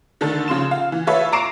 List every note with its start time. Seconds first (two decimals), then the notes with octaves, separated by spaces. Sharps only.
0.21 D3 D#3 A3 A4
0.48 C#3 F3 C6 E7
0.71 F5
0.92 E3
1.07 F4 A4 B4 C#5 E5
1.32 A#5 C#6 D6 C7 D7 E7